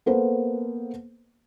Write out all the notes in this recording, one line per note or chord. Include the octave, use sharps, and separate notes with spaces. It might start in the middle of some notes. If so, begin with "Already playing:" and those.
A#3 B3 A4 B4 C5